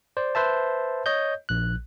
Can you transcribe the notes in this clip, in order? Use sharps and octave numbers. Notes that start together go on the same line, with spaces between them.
C5 D5
B4 C5 E5 A5
C#5 D#5 G6
A#1 F#6